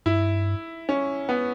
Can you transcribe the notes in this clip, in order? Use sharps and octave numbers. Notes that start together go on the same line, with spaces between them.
G2 E4
C#4
B3